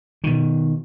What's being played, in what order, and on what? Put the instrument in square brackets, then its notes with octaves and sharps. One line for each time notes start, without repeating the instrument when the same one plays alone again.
[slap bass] B2 D#3